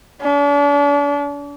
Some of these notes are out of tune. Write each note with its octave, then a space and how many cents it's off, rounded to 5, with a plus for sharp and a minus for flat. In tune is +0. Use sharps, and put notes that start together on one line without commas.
D4 -40